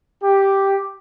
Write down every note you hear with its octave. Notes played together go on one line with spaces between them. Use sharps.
G4